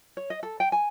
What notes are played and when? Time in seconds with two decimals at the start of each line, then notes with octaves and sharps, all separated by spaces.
0.17 C#5
0.30 D#5
0.43 A4
0.60 G5
0.72 G#5